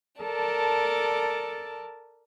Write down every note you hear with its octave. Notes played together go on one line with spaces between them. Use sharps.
A4 A#4 D5 A5